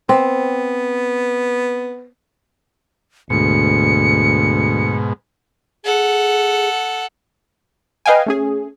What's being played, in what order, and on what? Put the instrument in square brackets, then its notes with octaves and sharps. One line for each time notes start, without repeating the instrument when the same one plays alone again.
[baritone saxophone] B3 [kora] C4
[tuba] D2 [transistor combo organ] G#2 B2 [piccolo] C#7
[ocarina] G#4 [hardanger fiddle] A4 F#5
[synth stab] B4 D#5 F5 G5 G#5
A3 C#4 G#4